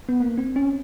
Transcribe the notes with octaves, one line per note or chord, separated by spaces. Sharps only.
B3
A#3
C4
C#4